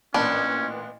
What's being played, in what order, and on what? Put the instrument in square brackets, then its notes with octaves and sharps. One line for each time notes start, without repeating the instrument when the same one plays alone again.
[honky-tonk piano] A1 A#2 [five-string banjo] B3 D4 [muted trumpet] C#4